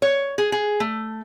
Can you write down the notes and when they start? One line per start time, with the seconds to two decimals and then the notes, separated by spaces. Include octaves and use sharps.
0.02 C#5
0.38 G#4
0.52 G#4
0.80 A3